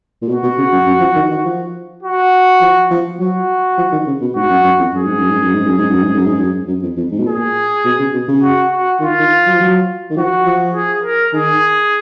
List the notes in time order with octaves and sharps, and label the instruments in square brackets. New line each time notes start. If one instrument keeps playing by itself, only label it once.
[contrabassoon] A#2
[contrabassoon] B2 [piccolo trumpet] F#4
[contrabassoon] B2
C#3
F#2
F#2
F3
D#3
D#3
F3
[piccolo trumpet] F#4
[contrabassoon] F3
F3
[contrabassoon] F#3 [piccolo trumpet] F#4
[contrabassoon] F3
D#3
C#3
B2
[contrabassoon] G#2 [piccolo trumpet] F#4
[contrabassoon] F#2
F#2
F2
[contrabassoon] F#2 [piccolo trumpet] G#4
[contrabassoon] G#2
F#2
G#2
F#2
G#2
F#2
G#2
F#2
G#2
F#2
G#2
F#2
F#2
F2
F2
G#2
B2
[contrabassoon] A#2 [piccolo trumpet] G#4
[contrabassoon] B2
C#3
B2
C#3
[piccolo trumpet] F#4
F#4
[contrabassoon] D#3 [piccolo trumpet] F4
[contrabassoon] D#3
F#3
F3
F#3
D#3
[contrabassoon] F3 [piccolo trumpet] F#4
[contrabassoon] F3
[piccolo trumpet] G#4
A#4
[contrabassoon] D#3 [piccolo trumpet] G#4